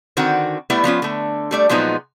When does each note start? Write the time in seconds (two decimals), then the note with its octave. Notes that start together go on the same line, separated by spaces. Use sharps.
0.17 D3 D#3 C4 F#4 F#5
0.70 G3 A3 B3 E4
0.84 F3 B3 C#4 F4
1.02 D3 A3
1.51 G3 A3 D5
1.69 A#2 F3 F#3 G#3 B3 D#4